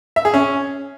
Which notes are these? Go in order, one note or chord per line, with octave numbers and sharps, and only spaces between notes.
E5
G#4
C#4